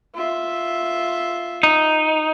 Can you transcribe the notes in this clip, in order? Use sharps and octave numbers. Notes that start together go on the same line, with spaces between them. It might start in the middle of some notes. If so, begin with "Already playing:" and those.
F4 E5
D#4